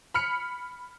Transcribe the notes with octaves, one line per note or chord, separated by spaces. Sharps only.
B5 F6 C#7